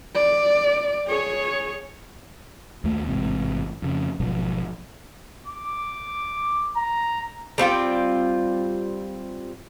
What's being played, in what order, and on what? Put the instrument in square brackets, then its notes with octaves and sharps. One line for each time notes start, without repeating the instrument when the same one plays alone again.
[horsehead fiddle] D5
G#4 C#5
[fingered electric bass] D#2 A3
A1 G#2 C3
F2 C#3
G#1 B2 F3 F#3
[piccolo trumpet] D6
A#5
[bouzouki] G3 C4 F4 G5